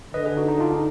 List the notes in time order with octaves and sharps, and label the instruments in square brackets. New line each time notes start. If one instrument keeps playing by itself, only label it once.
[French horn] D3 [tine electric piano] B4 D#5
[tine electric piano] G#4 B4
D#4 F#4
D#4
D4 F4
D#4